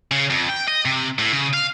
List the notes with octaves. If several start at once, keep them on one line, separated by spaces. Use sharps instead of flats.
C#3
F2
G5
D#5
C3
A2
C#3
F5